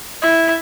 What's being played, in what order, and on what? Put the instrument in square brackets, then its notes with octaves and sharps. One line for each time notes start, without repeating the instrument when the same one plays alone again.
[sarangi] E4